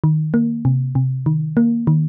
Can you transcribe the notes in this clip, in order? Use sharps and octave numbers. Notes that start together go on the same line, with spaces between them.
D#3
A#3
C3
C3
D#3
A#3
D#3